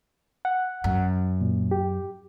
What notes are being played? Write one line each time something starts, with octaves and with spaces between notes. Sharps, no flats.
F#5
F#2
A#2
G4